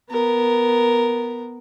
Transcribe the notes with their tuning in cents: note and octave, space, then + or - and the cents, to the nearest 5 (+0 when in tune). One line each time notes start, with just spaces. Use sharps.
B3 +0 A#4 +0